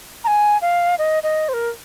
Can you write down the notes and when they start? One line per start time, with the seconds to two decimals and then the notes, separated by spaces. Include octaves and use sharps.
0.24 A#5
0.27 G#5
0.62 F5
0.98 D#5
1.23 D#5
1.49 C5
1.54 A#4